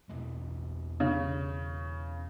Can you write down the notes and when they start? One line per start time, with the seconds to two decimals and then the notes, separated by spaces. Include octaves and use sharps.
0.09 E2 B2 A3
1.00 C#3